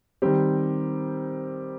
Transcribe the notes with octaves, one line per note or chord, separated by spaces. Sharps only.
D#3 G3 C4 G4